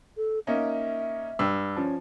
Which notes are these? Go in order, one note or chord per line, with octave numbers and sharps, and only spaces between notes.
A4
A#3 C#4 D#4 E5
G2 E6
F3 C#4